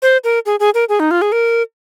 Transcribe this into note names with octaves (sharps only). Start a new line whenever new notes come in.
C5
A#4
G#4
G#4
A#4
G#4
D#4
F4
G#4
A#4